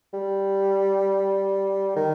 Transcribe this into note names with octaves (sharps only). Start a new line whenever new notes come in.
G3
D#3